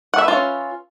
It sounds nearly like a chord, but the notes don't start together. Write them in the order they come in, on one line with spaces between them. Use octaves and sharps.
F#5 E5 B4 F4 C#4